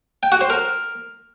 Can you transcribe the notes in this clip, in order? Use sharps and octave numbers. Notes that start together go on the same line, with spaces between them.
G5
F#4
C5
A#4